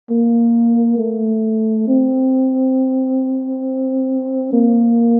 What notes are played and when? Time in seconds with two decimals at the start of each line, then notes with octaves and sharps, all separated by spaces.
0.10 A#3
0.99 A3
1.88 C4
4.53 A#3